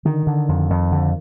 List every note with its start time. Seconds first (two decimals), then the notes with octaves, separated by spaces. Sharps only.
0.05 D3 D#3
0.27 D3
0.49 F2
0.70 F2
0.92 D3